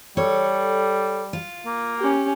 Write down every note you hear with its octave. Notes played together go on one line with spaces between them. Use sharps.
G3 A4 C#5
F4
A#3
C#4 G4